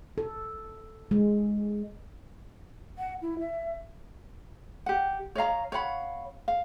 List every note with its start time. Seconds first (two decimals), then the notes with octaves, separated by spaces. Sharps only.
0.18 A4
1.11 G#3
2.98 F#5
3.22 E4
3.39 E5
4.86 G4 F#5
5.35 C#5 D#5 F5 A#5
5.72 C#5 F5 F#5 B5
6.48 F5